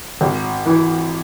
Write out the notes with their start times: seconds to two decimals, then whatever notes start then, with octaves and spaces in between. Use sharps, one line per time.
0.21 G#1
0.66 E3